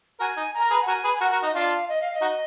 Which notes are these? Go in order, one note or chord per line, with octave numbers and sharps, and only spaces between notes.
F#4 A#4 G#5
D#4
A#5
A#4
G#4 B4
F#5
F#4 A#4 G#5
G#4 B4
G#5
F#4 A#4 F#5
F#4 A#4
D#4 D#5
D4 F4 F5
D#5
F5
D#5
D#4 F#4